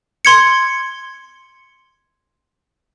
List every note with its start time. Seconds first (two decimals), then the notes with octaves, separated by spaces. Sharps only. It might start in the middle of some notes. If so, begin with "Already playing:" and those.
0.25 C6 G#6 C#7